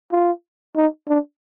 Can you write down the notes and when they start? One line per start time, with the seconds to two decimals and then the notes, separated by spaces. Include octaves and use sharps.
0.12 F4
0.76 D#4
1.08 D4